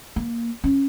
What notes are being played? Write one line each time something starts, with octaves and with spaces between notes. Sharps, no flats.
A#3
C#4